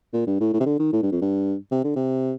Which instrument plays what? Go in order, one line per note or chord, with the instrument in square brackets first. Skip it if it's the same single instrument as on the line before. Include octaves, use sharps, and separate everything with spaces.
[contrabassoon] A#2
G2
A2
A2
C3
D3
D#3
A2
G2
F2
G2
C3
D3
C3